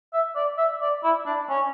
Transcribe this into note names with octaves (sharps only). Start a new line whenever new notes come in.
E5
D5
E5
D5
E4
D4
C#4